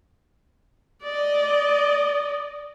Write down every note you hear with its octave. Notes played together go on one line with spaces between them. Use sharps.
D5 D#5